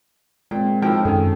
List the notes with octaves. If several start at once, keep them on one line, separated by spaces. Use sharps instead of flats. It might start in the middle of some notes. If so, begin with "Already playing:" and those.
A#2 G#3 C4 G5
A2 F3 D#4 F#4 A#4 G5
F#2 D#3 C#4 G#4 A4